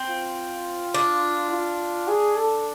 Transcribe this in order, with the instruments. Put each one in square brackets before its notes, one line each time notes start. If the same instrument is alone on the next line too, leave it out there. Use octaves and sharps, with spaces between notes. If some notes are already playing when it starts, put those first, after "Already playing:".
Already playing: [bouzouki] C4
[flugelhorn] F4
[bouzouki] D4
[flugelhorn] F4
G#4
A4